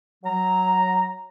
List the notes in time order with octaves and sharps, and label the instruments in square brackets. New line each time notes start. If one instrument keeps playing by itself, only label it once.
[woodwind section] F#3 A#5